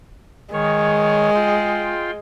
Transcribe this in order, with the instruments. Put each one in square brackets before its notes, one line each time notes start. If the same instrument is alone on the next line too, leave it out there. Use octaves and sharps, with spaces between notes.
[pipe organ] D#3 C#5 [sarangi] G#3
[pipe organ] F4 G5 C6